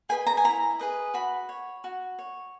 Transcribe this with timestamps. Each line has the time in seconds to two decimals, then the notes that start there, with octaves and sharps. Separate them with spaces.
0.09 G#4 B4 D#5 G#5
0.27 A#5
0.37 G#5
0.44 E4 A#5
0.79 G#4 B4 D#5
1.14 F#4 B5
1.49 C#5
1.84 F#4
2.19 C#5